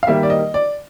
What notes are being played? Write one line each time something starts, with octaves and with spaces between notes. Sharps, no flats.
F5
D#3 G3 A#3 E5
D5
D#5
D5